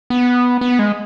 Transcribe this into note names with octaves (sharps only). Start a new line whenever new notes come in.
B3
B3
G#3